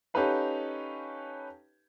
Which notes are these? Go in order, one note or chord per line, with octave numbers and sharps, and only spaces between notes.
C#4 D#4 G4 A4 B4 F5